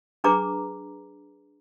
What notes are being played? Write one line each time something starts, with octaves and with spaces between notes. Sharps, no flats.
D4 G#4 B4 A#5 D6